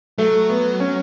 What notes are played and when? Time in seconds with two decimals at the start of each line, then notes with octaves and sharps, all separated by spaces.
0.18 F#3 A3
0.50 B3
0.80 C#4